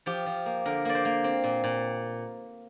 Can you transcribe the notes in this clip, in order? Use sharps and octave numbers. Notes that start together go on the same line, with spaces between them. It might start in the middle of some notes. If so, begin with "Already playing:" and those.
F3 G4
F3
A#3
D3 A#4
A#3 D5
C5
A#3
C4
A#2
A#2